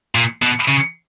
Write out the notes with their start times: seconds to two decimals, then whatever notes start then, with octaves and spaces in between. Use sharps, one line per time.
0.15 A#2
0.42 B2
0.68 C#3